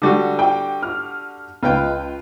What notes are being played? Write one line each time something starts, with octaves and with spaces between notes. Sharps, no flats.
D3 G3 F#4
G5
F6
C#2 F4 B4 G5